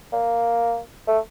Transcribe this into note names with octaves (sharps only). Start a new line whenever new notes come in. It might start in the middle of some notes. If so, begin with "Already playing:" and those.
A#3
A3